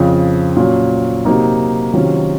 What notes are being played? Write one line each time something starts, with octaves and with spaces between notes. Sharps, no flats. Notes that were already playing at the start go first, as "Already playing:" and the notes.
Already playing: F2 C#3 F3
A#2 F#3 C#4
C3 F#3 A#3 D#4
C3 D#3 F#3 C#4 F4